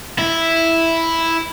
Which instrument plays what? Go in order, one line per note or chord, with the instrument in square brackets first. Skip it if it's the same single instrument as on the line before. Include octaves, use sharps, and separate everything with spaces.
[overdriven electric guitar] E4